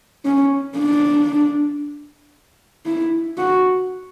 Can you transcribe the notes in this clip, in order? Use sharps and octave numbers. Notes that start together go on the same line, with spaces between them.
C#4
D4
E4
F#4